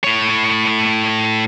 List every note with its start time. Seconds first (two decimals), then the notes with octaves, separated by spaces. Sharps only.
0.04 A2 C#5